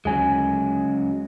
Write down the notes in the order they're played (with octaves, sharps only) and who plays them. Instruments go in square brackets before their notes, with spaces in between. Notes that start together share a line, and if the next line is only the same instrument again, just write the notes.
[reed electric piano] D2 G#5 [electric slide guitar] C#3 F#3 G#3